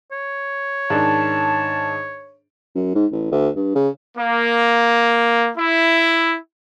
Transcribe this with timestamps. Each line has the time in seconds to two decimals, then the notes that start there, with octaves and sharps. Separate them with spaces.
0.12 C#5
0.90 G#2 D#3 D4 A5
2.75 F#2
2.95 G#2
3.12 A1
3.32 D2
3.56 G2
3.76 C#3
4.17 A#3
5.56 E4